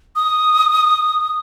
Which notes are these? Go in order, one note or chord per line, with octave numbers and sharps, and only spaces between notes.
D#6